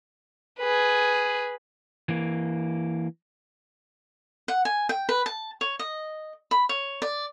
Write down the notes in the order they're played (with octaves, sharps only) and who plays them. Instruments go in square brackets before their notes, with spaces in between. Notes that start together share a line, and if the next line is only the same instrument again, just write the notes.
[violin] G#4 B4
[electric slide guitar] E3 A#3
[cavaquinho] F#5
G#5
G5
B4
A5
C#5
D#5
B5
C#5
D5